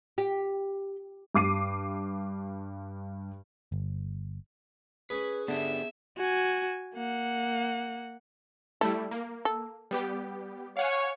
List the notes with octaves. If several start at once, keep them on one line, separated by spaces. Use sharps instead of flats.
G4
G2 D6 C7 D#7
G1
C#4 G#4 B4
D3 B3 G4 E5
F#4 G#5
A#3 F#5
G3 A3 E4 A4
A#3
A4
G3 B3 G4
C#5 F5 F#5 G#5